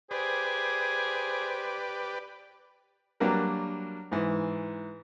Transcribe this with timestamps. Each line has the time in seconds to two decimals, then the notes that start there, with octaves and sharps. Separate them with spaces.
0.11 G4 G#4 B4 C5 D5
3.20 F#3 G3 A#3 D4 F#4 A#4
4.12 G#2 E3